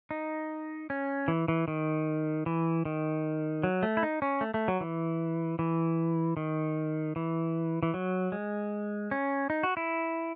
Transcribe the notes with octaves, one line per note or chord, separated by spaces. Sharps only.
D#4
C#4
E3
E3
D#3
E3
D#3
F#3
A3
E4
D#4
C#4
A3
A3
F#3
E3
E3
D#3
E3
E3
F#3
G#3
C#4
D#4
F#4
E4